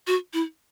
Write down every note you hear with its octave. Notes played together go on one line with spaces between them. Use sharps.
F#4
E4